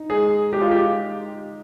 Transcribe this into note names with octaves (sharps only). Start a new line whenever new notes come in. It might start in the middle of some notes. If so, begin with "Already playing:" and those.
Already playing: D#4
G#3 G#4
G#3 G4
F4
G4